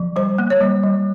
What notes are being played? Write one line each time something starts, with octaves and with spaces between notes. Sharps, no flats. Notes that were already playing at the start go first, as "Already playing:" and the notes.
Already playing: F3
G3 C5
A#3
C#5
G3
G3